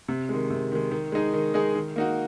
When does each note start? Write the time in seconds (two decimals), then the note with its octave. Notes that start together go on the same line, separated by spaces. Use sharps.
0.08 C3
0.29 D#3 G#3
0.50 C3
0.72 D#3 G#3
0.91 D#3
1.12 G#3 D#4 G#4
1.33 D#3
1.54 G#3 D#4 G#4
1.75 D#3
1.96 A#3 D#4 F#4